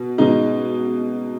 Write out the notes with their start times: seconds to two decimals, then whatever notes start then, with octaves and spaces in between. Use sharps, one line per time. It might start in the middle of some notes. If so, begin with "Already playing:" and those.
Already playing: B2
0.18 B2 G#3 D#4